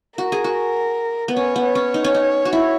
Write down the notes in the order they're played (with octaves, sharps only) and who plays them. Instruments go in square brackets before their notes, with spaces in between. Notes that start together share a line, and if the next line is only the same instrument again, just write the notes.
[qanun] F#4 [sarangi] A#4
[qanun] G#4
F#4
B3
[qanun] C#4 [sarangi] C#5
[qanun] B3
[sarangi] C#5
[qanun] C#4
D#4
C#4
D#4
F#4
E4